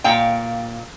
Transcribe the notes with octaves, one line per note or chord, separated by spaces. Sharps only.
A#2 F5 G5